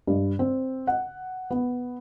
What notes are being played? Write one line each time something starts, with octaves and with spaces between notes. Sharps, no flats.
G2
C4
F#5
B3